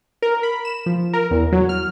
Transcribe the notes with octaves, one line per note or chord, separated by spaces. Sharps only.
A#4
B5
E7
F3
A#4
E2
F#3
F6